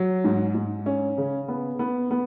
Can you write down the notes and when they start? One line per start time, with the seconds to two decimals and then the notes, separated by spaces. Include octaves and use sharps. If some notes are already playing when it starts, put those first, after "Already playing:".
Already playing: F#3
0.24 G#2
0.55 G#2
0.86 C#4
1.18 C#3
1.48 B3
1.79 B3
2.11 B3